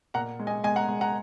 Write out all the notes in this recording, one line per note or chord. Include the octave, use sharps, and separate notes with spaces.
A#2 F#5 A#5
G#3
D#5 G#5
G#3 D#5 G#5
F#5 A#5
G#3
F#5 A#5